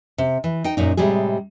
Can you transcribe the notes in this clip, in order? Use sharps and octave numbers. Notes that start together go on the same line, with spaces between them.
C3
E3
D#4 G5
F#2 A#2 D#4
A2 C3 G3 G#3 G#4